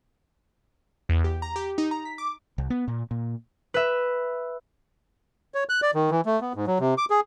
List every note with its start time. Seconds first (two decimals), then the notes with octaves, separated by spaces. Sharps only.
1.09 E2
1.24 G4
1.42 A#5
1.56 G4
1.78 D#4
1.91 A#5
2.05 B6
2.18 D6
2.58 C2
2.70 B3
2.88 A#2
3.11 A#2
3.74 B4 E5
5.54 C#5
5.69 F#6
5.82 D5
5.94 D#3
6.10 E3
6.26 A3
6.41 B3
6.55 G#2
6.67 F#3
6.80 C3
6.98 D6
7.10 G#4